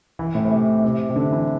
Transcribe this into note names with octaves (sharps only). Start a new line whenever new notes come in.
E3
A2
A2
C3
C3
C3
D3
E3